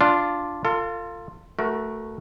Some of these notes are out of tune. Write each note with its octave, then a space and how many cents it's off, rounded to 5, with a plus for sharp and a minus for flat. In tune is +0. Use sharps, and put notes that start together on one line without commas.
D4 +0 F4 +0
F4 +0 A4 +35
A3 +0 F#4 +0 A#4 +30